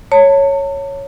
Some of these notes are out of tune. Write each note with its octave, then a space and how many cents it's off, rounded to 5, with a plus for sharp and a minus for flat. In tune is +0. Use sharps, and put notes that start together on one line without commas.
C#5 +0 A5 +40